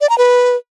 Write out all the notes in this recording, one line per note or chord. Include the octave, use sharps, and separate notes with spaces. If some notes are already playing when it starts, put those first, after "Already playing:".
D5
A#5
B4